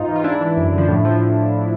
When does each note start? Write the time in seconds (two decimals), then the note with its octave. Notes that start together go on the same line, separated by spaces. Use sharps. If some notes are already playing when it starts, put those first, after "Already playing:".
Already playing: G#2 D#4 F4
0.08 E3
0.16 F4
0.24 G#2 D4 E4
0.41 E3
0.57 F#2
0.73 D3 F3
0.88 A2
1.05 F3